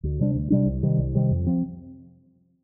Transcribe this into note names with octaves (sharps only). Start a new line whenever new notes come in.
D2
C3 G3 D4
D2
C3 G3 D4
C2
C3 D#3 G3
C2
C3 D#3 G3
F2
F3 C4